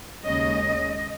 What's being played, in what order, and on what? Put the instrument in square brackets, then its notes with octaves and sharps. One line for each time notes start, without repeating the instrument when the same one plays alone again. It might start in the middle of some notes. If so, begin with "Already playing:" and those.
[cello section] D#2 C#3 G#3 C#4 D#5